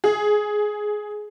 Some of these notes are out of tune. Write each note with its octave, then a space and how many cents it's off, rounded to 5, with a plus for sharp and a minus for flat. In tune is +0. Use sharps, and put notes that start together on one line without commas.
G#4 +10